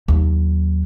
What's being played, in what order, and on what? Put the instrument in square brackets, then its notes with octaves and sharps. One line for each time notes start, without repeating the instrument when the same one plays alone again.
[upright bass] D#2 F#3